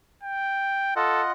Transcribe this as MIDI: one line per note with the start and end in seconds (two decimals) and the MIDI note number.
0.23 0.92 79
0.96 1.32 65
0.96 1.22 69
0.96 1.32 75
0.96 1.32 78